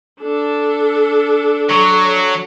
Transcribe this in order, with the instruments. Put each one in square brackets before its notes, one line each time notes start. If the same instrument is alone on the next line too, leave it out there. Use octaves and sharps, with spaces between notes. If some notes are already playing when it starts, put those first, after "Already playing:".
[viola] D4 A4
[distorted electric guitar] F#3